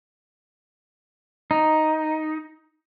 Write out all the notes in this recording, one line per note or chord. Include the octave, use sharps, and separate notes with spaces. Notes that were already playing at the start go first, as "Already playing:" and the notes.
D#4